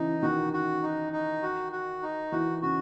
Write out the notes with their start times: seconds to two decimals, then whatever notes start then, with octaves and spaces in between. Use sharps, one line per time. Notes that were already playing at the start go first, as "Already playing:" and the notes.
Already playing: C#3 E3 D#4
0.23 D#3 F#4
0.53 F#4
0.83 D#4
1.13 D#4
1.43 F#4
1.72 F#4
2.02 D#4
2.32 E3 F#4
2.62 C#3 F#4